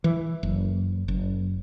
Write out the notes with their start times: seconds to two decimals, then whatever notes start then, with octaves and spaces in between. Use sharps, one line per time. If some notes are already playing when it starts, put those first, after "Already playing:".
0.04 E3
0.43 F#1
1.08 F#1